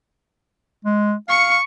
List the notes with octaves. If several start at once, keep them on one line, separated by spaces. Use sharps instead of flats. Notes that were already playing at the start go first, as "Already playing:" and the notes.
G#3
F5 C#6 C#7